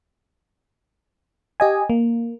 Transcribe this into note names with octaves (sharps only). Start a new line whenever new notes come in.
G4 D#5 G#5
A#3